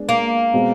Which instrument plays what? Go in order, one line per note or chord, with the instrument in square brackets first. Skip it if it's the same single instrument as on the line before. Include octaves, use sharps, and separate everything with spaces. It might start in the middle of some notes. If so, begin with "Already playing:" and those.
Already playing: [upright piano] G#3 B3 D4
[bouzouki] A#3
[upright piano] B2 G#3 C4